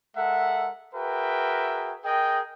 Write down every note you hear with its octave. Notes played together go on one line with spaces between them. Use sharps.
G#3 A4 A#4 E5 F#5
F#4 G#4 A#4 B4 E5 G5
G#4 A#4 D#5 G5